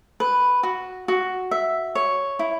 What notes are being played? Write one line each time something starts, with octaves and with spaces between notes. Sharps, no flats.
B4
F#4
F#4
E5
C#5
E4